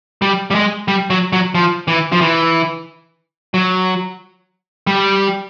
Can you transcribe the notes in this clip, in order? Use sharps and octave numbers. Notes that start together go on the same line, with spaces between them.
G3
G3
G#3
G3
F#3
F#3
F3
E3
F3
E3
F#3
G3